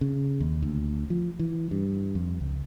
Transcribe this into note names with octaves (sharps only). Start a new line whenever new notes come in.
C#3
D#2
D2
F3
E3
G2
F2
C#2